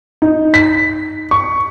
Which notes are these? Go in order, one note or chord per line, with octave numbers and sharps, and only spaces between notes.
D#4
B6
C#6